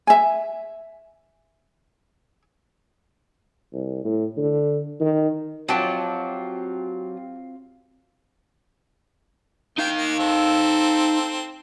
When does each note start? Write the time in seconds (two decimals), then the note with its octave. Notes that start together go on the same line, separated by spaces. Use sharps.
0.07 E5 G#5
3.73 C2
4.04 A2
4.37 D3
5.00 D#3
5.69 F#3 C4 F4 G4 A5
9.78 A#3 D#4 F5 G5
9.96 A#3
10.19 C4 A4